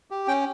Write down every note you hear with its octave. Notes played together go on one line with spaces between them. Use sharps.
G4
C#4 G5